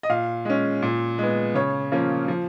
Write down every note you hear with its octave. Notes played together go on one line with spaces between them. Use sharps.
D#5
A#2 F5
G#3 C#4
A#2
G#3 B3
C#3 C#5
F3 A#3 C#4
F3